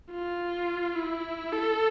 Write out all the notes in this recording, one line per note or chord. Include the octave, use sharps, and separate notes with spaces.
F4
E4
A4